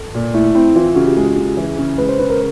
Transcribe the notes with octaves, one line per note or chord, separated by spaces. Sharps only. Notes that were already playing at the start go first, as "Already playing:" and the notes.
Already playing: A4
A#2
A3 E4
C4 E4
E3 F4
C#3 F#4
G4
G#3 G#4
C#3
E3
C#3
G#3 B4
C5
C#3 B4
A#4